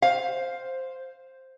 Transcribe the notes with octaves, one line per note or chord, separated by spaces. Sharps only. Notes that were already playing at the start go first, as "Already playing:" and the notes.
C5 F5